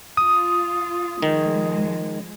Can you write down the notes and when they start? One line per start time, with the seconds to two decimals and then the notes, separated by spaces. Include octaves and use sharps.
0.17 F4 D#6
1.22 D#3 F3 G#3